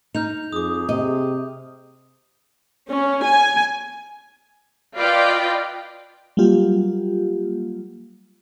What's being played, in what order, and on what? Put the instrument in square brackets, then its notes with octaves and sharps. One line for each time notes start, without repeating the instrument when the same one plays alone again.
[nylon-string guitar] D#4 [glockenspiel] F6 G6 F7
[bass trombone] F2 [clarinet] G#4 [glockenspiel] D6 D#6
[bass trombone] C3 [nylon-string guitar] D#5
[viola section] C#4
G#5
F4 B4 D5 D#5 F5 G5
[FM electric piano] F#3 G3 A#3 F4 G4